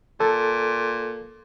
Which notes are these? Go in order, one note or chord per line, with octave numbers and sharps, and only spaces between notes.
A#2 A4